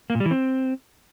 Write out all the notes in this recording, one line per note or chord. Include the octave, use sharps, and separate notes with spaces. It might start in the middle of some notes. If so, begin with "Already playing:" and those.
A#3
A#2
G3
E3
C4